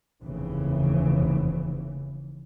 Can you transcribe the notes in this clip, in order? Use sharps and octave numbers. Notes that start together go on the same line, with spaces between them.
F1 D#2 C#3 E3